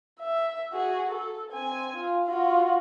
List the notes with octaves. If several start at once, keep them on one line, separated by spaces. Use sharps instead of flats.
E5
F#4 G#4
A4
C4 G#5
F4
F4 F#4